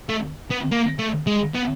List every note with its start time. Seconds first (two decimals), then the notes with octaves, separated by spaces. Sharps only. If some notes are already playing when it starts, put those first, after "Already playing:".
0.09 A3
0.51 B3
0.72 A#3
0.99 A3
1.27 G#3
1.55 B3